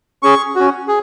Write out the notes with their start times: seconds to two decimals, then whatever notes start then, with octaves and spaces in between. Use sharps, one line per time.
0.23 C#4 G#4 C#6
0.55 C#4 F#4
0.88 G#4